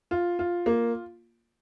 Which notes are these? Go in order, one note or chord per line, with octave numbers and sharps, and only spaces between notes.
F4
F4
A#3